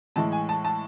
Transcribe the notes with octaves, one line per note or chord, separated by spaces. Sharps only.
A2 E3 G#3 A5
G#5
A5
A5